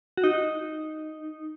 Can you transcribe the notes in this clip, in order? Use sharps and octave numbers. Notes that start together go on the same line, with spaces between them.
F#4
D#4